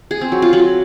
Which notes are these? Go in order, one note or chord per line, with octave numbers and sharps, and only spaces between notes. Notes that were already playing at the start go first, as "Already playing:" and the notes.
G#4
C4
F#3
F4
F#3